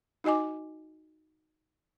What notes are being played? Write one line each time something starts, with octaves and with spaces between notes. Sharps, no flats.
D#4 F#4 D#5 G#5 D6